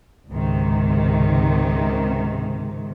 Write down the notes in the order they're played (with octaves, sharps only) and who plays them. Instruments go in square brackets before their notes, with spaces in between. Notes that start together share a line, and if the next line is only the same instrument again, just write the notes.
[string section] C#2 G#2 C3 D#3